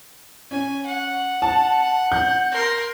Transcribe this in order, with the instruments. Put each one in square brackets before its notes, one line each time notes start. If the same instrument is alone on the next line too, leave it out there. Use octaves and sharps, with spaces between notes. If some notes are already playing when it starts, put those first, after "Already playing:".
[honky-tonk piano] C#4 [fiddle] G#5
[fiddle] F#5
[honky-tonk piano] A5
G6
[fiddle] A#4 C6